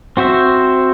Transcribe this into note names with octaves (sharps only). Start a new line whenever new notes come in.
C4 F#4 C5 E5